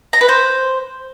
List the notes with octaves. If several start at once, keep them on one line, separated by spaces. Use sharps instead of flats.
A#5
B4
C5